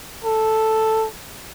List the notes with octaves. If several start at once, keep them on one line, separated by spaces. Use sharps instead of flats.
A4